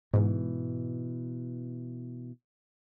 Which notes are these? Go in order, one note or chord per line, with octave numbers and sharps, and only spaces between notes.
G#2 B2 E3